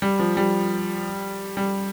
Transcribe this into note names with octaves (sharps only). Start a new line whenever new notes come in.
G3
F3
G3
G3